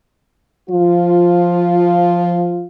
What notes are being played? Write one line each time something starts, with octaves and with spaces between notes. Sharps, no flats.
F3 F4